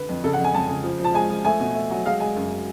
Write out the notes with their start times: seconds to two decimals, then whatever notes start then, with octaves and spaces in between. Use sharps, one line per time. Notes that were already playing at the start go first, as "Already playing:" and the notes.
Already playing: D3 B4
0.09 F2
0.24 C#3 A4
0.33 F#5
0.38 F2
0.44 G#5
0.54 F2 A5
0.69 C#3
0.84 F3
1.00 F3 A5
1.14 G#3 G#5
1.30 F3
1.45 A3 G#5
1.60 B2
1.75 A3
1.91 F#3
2.05 G#3 F5
2.20 G#3 G#5
2.36 F#2